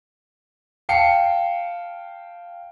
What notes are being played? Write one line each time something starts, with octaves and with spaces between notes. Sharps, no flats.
F5 G5 A5 C7 C#7